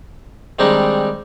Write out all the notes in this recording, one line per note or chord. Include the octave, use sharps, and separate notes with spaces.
D#3 G3 G#3 C4 D4 D#4